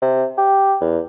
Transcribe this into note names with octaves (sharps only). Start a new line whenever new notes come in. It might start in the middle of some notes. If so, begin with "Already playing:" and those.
C3
G4
E2